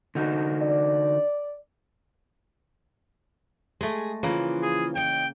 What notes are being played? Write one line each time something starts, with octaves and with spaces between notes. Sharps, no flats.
D3 D#4 F#4
D5
G#3 A3 G#4
C#3 E3 F3 A#3 F4
G#4
D#4 C#5 G5